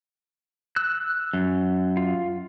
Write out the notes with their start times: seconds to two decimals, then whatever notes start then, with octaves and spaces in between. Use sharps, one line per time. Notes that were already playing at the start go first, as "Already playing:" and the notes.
0.76 E6 F#6
1.33 F#2
1.97 F4